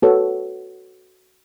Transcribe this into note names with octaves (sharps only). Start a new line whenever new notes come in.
F#4 A4 B4 C#5